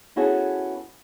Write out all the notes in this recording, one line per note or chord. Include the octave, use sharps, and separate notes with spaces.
B3 C#4 E4 F#4 G#4 A4